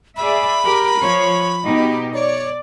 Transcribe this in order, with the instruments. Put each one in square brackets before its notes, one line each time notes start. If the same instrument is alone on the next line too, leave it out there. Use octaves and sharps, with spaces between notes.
[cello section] G#4 D5 E5 [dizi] B5
[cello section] G4 A#4
F3 C#5
B2 D#4 G4
[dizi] C#5 [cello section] D5